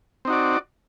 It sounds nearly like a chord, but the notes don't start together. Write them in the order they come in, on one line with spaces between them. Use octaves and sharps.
C4 D#4 F#4 D5